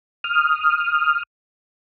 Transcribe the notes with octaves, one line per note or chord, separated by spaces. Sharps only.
D#6 F6